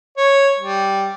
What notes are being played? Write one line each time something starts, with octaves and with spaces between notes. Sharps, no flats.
C#5
G3